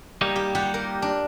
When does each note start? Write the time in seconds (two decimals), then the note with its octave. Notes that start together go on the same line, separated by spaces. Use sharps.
0.21 G3 A#3 D#4
0.36 G4
0.55 F4 G4 F#5
0.74 A#4
1.02 D4